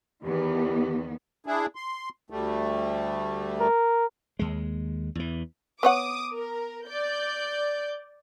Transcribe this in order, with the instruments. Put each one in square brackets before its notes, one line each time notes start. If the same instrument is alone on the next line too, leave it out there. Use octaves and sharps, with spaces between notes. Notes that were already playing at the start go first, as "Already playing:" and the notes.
[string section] E2 E3 [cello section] D#3 B3 [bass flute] G4
[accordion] D4 E4 G#4
C6
D2 G3 A3
[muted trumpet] A#4
[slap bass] D#2 G#3
E2 E3
[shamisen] B3 C#5 F#5 [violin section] D6 D#6
[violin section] A#4
D5 G6